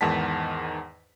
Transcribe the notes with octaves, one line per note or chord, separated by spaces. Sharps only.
E2 G#2 D#3 F#5 A5 B6